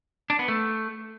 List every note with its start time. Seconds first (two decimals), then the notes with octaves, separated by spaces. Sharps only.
0.30 D4
0.39 B3
0.48 A3